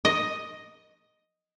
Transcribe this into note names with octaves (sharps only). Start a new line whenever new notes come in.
D#5